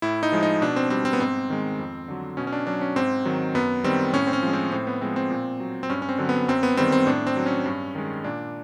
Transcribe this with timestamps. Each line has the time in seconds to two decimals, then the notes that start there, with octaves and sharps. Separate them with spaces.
0.02 A2 E4
0.23 D#4
0.32 F3 G#3
0.43 D#4
0.62 B2 D4
0.76 C4
0.90 G3 C4
1.05 C4
1.13 B3
1.20 G#2 C4
1.50 D#3 G#3
1.79 F2
2.08 D3 F#3
2.37 B2 C#4
2.47 C#4
2.52 D4
2.67 F#3 D4
2.81 C#4
2.96 G#2 C4
3.25 D#3 F#3
3.55 F#2 B3
3.84 D#3 G3 C4
4.13 A2 C#4
4.27 C4
4.33 C#4
4.42 F3 G#3
4.53 C4
4.72 A2 C4
4.87 B3
5.01 F3 G#3 C4
5.16 C4
5.30 A#2
5.60 F#3
5.83 C4
5.90 G2 C#4
6.02 C#4
6.09 C4
6.18 D3 F#3
6.29 B3
6.48 F#2 C4
6.63 B3
6.77 D#3 G3 C4
6.92 C4
7.07 A2 D4
7.27 C4
7.37 F#3
7.46 C#4
7.65 G2
7.95 D#3 G#3
8.24 A#2 D4